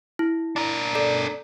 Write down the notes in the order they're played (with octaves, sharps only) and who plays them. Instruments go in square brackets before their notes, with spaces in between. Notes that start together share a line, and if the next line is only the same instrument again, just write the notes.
[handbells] E4
[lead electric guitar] D4 A#4
[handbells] A4 D5